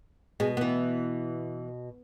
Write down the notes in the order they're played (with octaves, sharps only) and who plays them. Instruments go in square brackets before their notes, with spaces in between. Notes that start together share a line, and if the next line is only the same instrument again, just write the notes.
[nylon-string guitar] B2 [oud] G#3
[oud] E3 B3